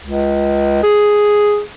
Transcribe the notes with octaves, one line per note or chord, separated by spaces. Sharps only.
C#2
G#4